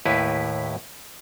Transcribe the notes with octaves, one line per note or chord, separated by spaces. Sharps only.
D#2 A2 E4 G4 B4 G#5